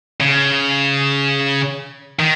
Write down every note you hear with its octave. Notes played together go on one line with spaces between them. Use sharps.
C#3
D#3